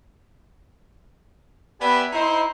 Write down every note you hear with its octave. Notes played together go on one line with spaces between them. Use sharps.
B3 G4 B4 D5 E5 G#5
D#4 E4 C5